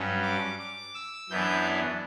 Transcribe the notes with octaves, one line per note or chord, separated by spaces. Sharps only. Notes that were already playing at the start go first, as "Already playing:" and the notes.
Already playing: G2 F#3 C#4
D6
D6
E6
F#2 E3 B3 D4 G6